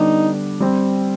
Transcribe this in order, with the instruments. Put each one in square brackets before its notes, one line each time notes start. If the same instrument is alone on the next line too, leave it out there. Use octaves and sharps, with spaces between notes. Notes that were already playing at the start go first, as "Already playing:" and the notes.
Already playing: [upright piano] D3 G3 B3 D4 [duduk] D#4
[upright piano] G3 C4